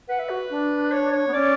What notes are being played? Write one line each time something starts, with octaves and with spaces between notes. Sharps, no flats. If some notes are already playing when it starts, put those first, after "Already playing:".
B4 F#5
E5
F#4
D4
C#5
C#5
B3
C#4 D5